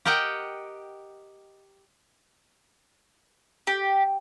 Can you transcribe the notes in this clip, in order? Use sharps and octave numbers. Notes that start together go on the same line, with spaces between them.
G4 A#4 D#5 F#5 G5
G4